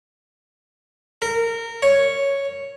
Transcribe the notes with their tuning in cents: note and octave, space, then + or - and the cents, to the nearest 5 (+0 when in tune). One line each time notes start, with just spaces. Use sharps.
A#4 -20
C#5 +0